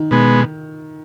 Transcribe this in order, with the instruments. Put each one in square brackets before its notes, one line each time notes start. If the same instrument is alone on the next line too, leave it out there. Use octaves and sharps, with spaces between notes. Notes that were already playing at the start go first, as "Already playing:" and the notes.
Already playing: [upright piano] D#3
[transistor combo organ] B2 G#3 B3